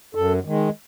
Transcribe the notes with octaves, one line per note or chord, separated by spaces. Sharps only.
F#2 A4
D#3 G#3